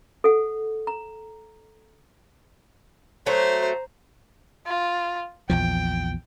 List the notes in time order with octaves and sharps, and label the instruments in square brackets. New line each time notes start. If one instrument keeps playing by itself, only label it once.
[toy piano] A4 F#5
A#5
[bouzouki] F#3 A3 [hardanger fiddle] C5 A#5
[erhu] F4
[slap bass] A#1 E2 F3 [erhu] G5